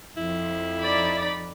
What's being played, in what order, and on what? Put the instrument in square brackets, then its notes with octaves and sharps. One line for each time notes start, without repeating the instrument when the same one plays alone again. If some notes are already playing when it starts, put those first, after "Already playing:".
[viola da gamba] F2 F3 [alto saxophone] E4
[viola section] D#4 D5 B5